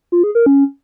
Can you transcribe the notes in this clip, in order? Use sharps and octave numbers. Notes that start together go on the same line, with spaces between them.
F4
G#4
A#4
C#4